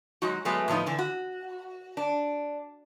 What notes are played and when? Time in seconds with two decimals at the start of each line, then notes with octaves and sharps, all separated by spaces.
0.22 F#3 G#3 D#4 F#4
0.45 F#3 G#3 A3 B3
0.68 A2 F3 B3 D#4
0.86 D3 E3
0.99 F#4
1.97 D4